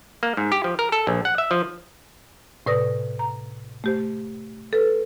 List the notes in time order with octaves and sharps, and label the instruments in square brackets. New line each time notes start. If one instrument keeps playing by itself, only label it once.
[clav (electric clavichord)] A#3
G#2
G4
F3
A#4
A4
A#1
F#5
E5
F3
[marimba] A2 C3 B4 D5 D#6 A#6
A#5
A3 G4 C5
A4 B4